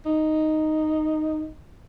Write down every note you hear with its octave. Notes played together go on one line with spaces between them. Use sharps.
D#4